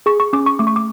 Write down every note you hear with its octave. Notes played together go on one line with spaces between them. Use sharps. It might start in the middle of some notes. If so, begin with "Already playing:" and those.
G#4 C#6
C#6
C#4 D6
C#6
A3 D6
C#6
D6